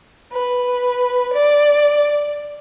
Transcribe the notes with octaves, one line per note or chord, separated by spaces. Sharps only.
B4
D5